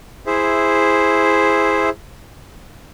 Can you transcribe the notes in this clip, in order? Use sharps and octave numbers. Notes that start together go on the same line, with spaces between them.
E4 G#4 C5 E5